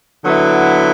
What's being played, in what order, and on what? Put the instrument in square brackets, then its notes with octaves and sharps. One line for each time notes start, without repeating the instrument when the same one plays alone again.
[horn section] D3 F#3 B3 E4